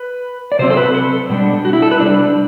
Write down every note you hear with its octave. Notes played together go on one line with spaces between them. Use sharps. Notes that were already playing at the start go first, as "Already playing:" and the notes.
Already playing: B4
D5
C3 F#3 C4 C5
A4
B4
A4
B2 G3 D4
F#4
E4
A4
B4
C3 G3 D4 D5